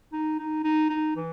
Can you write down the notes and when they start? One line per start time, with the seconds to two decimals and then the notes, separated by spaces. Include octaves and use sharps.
0.13 D#4
0.39 D#4
0.64 D#4
0.90 D#4
1.16 E3